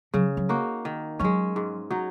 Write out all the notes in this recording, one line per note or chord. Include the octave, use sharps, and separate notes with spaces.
C#3 F#3
F#3
A#3 D#4 F#4
D#3
F#3 G#3 C#4
G#2
F#3 D#4